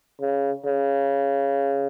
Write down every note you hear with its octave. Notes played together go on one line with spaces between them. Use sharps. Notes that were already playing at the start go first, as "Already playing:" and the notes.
C#3
C#3